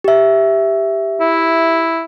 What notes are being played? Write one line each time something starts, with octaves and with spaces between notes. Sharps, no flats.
G4 E5
E4